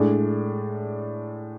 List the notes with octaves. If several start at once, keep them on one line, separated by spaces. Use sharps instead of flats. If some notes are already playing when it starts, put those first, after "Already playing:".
Already playing: A2 G#3 D4